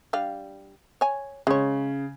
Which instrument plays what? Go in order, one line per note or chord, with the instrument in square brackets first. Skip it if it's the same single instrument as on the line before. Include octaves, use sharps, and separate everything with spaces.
[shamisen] G3 D4 F5
C#5 G#5
[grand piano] C#3 [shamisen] G#3 C#5